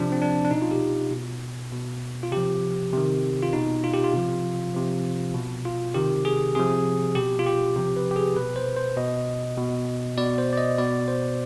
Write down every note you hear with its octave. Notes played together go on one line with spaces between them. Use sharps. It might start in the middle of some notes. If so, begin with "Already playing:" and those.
Already playing: C3 F3 D4
C4
D4
D4
B2 D#4
F4
G4
B2
B2
F4
C3 F3 G4
C3 D#3
F4
B2 D#4
F4
G4
F4
C3 F3
C3 F3
B2
F4
C3 D#3 G4
G#4
C3 F3 G#4
B2 G4
F4
G4
C3 F3 G4
B4
G4
G#4
B2 B4
C5
C5
B2 D#5
B2
B2 D5
C5
D5
D#5
B2 D5
C5